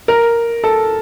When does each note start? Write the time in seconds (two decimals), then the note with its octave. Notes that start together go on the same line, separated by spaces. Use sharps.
0.08 A#4
0.64 A4